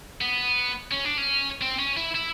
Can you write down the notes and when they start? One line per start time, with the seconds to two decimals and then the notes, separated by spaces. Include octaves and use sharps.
0.21 B3
0.91 C#4
1.05 D4
1.18 C#4
1.61 C4
1.79 C#4
1.97 E4
2.15 E4